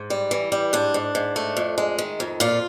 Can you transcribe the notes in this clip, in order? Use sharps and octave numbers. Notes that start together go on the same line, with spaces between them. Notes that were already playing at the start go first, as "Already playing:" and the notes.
Already playing: G#2
G3
E3
G3
G#2 D4
G#2
G#2
A3
F2
G#3
D#3
F2
A#2 F4